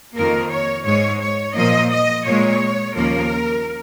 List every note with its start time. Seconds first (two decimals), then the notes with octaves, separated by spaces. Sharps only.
0.16 F2 D#3 A#3 A#4
0.50 C#5
0.86 G#2 G#3 C#5
1.21 C#5
1.56 A#2 F3 A#3 D#5
1.91 D#5
2.26 A#2 G#3 C#5
2.96 D#2 C#3 F3 A#3 A#4